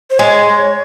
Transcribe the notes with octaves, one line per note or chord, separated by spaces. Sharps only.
C5
G#3 C#5